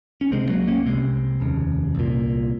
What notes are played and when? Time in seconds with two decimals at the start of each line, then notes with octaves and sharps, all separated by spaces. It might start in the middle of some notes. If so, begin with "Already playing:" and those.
0.21 C#4
0.31 C#2 C3 G#3 C4
0.49 F#3 A#3
0.67 A#3 C#4
0.86 C2 C3 G#3 C4
1.40 F1 D#2 C#3
1.95 C2 A#2